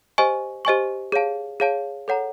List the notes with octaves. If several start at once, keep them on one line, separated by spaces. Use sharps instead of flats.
G4 C5 D#5 G#5 C#6
G4 C5 D#5 G#5 C#6
G#4 C#5 F5 A5
G#4 C#5 F5 A5
A4 C#5 F#5 A#5